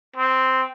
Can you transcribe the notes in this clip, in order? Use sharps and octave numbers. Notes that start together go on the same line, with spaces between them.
C4